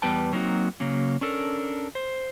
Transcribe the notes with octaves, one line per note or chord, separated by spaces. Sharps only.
E2 G3 B3 B4 G5 A5
F#3 A#3 C4 D#4 E4 F#4
C#3 F#3 A#3 C#4
C#4 D4 A4 A#4
C5